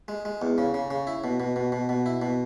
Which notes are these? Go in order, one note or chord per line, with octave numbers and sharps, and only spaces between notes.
G#3
G#3
E2
C#3
C#3
C#3
E4
B2
B2
B2
B2
B2
E4
B2